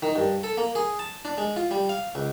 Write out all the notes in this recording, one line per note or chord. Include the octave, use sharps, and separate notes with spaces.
D#3
G2
A4
A#3
G#4
A5
D4
G#3
F4
G3
F5
C#2